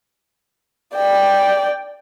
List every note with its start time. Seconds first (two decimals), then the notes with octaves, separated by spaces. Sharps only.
0.95 D5 G5